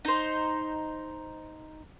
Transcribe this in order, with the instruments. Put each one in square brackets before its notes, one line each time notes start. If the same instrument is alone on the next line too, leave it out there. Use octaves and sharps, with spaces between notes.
[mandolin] D#4 C5